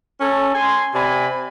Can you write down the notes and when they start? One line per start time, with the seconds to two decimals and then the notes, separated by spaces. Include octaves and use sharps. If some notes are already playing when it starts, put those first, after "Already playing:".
0.20 C#4 A4
0.55 G#5 C6
0.94 C3 D5 G#5 B5